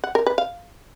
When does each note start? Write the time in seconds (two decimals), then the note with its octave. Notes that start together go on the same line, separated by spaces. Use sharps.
0.04 F#5
0.15 A#4
0.26 B4
0.38 F5